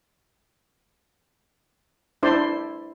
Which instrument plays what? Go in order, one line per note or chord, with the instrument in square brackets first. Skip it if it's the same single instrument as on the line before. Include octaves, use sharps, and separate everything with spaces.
[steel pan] D4 E4 C5 D5 C6